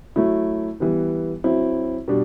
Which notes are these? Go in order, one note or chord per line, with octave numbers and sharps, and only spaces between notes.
F#3 A3 E4
E3 G3 B3
F#3 C4 E4
B2 G3 D4